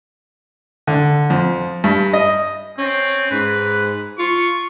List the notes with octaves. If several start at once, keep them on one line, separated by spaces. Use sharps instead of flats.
D3
F2
G2
D#5
C4 C#4
G#2 B4
F4 C#6